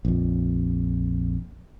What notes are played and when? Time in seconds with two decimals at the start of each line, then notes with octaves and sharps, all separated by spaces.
0.05 A#1 F2